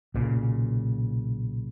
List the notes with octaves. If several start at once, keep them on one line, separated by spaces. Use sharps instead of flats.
B1 A#2 C#3